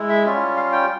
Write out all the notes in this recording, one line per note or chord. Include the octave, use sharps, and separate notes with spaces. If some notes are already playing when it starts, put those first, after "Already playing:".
Already playing: G#3 E4
E5
G3 C#4 F4
F5
G5